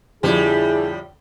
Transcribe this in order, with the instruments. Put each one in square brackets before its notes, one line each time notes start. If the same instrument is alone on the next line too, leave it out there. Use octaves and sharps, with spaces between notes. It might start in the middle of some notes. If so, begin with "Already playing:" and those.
[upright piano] F2 D3 F3 [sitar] A2 G3 [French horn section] E4 G#4